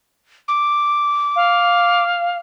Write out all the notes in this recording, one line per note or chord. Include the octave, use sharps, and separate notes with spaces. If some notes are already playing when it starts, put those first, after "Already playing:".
D6
F5